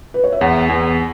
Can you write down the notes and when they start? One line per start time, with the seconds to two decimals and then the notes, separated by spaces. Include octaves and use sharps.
0.14 B4
0.24 C#5
0.32 E5
0.41 E2 F#5
0.69 E2